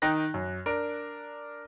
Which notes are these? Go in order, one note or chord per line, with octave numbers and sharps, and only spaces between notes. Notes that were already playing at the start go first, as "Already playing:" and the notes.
D#3 D#4 G5 F#6 A#6
F#2
D4 A#4 D7